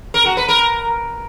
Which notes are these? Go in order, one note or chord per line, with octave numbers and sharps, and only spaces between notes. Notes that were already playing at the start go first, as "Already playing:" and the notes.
A#4
F#4
B4
A#4